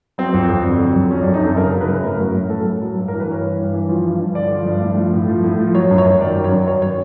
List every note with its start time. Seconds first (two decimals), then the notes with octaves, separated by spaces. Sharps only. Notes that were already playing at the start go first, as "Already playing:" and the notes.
0.18 F#3 C4
0.34 F2
0.49 F2
0.64 D3
0.81 F#3
0.95 F2
1.11 F#3 C#4
1.22 D4
1.26 F#2
1.34 D#4
1.42 F#2 A4
1.57 C#3 A#4
1.73 F#3
1.81 B4
1.89 F#2
2.03 A2 A#4
2.20 F#3
2.34 A2
2.50 F#3 A4
2.65 A2
2.82 F#3
2.97 G2
3.08 A#4
3.12 E3
3.20 B4
3.27 G2 C#5
3.42 E3
3.58 G2
3.74 E3
3.89 F3
4.04 G2
4.20 G2
4.35 D3 D5
4.51 F3
4.67 G2
4.82 A2
4.97 F3
5.13 A2
5.28 F3
5.44 A2
5.59 F3
5.74 F#3 C#5
5.91 F#2
5.98 C#5
6.05 F#2
6.21 D#3 D5
6.37 F#3
6.44 C#5
6.51 F#2
6.68 F#3 C#5
6.82 C#5